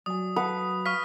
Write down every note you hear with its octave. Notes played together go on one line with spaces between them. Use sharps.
F#3 D5 G#5 D#6
A4 B4 F5 F#5 D#6
F5 C#6 F6 B6